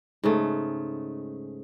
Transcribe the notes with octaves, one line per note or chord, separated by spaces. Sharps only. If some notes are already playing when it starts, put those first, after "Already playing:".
G#2 C#3 A3